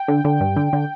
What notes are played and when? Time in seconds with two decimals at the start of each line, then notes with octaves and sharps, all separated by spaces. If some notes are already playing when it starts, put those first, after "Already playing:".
Already playing: G5
0.08 D3
0.25 D3
0.41 G2
0.56 D3
0.73 D3